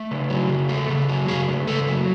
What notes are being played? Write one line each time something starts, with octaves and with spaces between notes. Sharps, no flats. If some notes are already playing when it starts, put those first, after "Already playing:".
Already playing: A3
C#3
F#3
C#3
A3
C#3
F#3
C#3 G#4
A3
C#3 A4
F#3